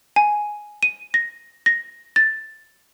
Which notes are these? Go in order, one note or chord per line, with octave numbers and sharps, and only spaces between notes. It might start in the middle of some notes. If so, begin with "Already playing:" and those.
G#5
D#7
A#6
A#6
A6